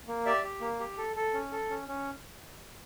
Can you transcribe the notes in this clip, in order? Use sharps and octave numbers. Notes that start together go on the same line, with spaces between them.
A#3
G4 D5 E5
G4
A#3
G4
A4
A4
C#4
A4
C#4
C#4